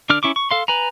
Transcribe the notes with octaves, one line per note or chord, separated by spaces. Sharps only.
D3 D4 D6 F6
C#4 E4 C#6 D6
C#6
A4 F5 C6
B4 G#5 A#5